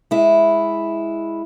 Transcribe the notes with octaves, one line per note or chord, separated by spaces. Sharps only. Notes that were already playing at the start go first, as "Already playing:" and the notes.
G#3 E4